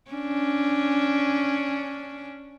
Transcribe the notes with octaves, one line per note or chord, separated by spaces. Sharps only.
C#4 D4